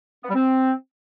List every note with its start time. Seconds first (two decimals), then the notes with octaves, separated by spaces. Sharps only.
0.23 B3
0.29 G3
0.34 C4